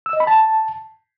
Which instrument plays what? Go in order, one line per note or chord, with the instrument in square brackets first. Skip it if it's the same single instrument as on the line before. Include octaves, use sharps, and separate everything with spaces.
[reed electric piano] E6
D#5
B5
A5